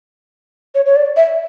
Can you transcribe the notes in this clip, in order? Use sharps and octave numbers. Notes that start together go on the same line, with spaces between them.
C#5
C#5
D5
E5